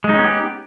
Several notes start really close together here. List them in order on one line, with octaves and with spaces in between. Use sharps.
G#3 D#4 C#4 B3 G4